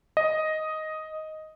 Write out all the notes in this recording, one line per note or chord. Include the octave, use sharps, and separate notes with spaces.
D#5